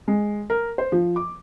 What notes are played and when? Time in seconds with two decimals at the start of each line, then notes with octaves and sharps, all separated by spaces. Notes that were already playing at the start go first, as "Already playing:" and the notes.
0.08 G#3
0.50 A#4
0.78 C5
0.92 F3
1.16 D6